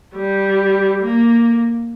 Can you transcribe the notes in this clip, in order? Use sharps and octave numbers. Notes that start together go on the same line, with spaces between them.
G3
A#3